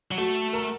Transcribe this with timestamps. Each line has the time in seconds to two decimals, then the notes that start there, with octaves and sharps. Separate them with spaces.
0.11 F#3
0.18 A3 F#4
0.53 A#4